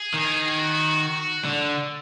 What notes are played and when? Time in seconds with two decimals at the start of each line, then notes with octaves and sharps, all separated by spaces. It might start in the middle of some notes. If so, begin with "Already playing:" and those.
Already playing: G#4
0.14 D#3
0.58 F#4
1.45 D3